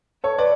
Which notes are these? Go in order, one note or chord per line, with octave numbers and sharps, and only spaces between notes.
A4 C#5
B4 D5